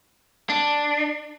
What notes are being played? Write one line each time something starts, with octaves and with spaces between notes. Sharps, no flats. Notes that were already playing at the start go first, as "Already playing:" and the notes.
D4